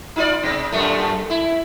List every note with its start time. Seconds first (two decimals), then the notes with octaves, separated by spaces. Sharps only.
0.16 D#4 F4 D5
0.43 C3 C4
0.72 F#2 A#2 A3
1.30 E4